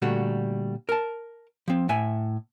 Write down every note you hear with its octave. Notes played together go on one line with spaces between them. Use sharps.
A#2 D3 G3 A3 F#4
A#4 A5
F3 C4
A2 E5 G#5